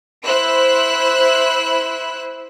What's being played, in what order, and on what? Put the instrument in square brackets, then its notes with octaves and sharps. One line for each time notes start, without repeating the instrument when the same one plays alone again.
[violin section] E4 C5 E6 F#6